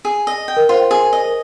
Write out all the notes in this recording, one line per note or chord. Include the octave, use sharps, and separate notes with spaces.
G#4
D#5
G5
A#4
F4 C5
G#4
D#5
A#4